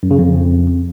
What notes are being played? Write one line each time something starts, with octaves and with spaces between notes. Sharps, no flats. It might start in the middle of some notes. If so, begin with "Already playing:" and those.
F#2
C#3
F2